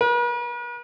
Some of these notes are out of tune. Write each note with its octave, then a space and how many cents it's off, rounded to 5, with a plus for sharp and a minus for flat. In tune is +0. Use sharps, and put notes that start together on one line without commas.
B4 -45